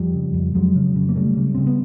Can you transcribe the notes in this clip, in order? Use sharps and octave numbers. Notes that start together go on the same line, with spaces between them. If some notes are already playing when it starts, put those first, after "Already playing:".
Already playing: F2 F3 G3
C#3
F2
F2 F#3 G#3
C#3
C#3
A#3
C#3 G3 A3
C#3
C#3 C4
B3